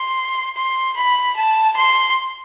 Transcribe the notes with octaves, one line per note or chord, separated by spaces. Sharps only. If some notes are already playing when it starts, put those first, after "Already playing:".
Already playing: C6
C6
B5
A5
C6